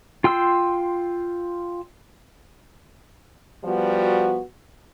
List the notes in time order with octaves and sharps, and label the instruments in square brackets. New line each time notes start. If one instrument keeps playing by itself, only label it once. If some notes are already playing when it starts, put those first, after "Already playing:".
[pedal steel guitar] F4 G5 C6 E6
[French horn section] F3 G3 B3 F#4